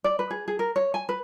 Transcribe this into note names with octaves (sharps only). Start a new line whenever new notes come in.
D5
B4
G#4
G#4
A#4
C#5
G#5
B4